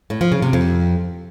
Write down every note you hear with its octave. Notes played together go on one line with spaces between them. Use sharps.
A2
F3
C#3
C3
F2